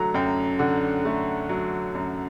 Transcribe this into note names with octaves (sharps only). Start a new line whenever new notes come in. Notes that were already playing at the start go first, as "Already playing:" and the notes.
Already playing: D3 F#3 A3 A#5
F#2 G5
D3 F#5
A3
F#3
F#2